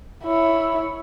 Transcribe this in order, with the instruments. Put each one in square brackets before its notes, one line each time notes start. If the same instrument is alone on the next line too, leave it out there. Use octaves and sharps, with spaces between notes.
[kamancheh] E4 C#5